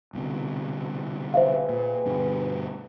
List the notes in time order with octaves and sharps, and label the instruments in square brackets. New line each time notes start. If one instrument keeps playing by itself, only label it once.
[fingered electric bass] C2 B2 D3
[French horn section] G4 G#4 B4 [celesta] C5 E5 F5
[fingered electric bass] A#2
G2 B2 D3